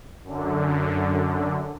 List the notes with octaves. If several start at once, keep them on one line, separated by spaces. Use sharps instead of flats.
F#2 D3